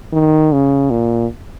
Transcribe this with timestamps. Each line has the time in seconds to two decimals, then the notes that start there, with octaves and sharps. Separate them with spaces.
0.13 D#3
0.52 C#3
0.91 A#2